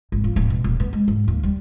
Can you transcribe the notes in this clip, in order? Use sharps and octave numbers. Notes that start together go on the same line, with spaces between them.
G#1
F3
D1
B2
D#1
B3
G#3
G#2
D#2
G3